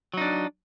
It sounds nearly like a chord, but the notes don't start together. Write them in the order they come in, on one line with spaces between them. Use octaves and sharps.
F#3 D#4 D4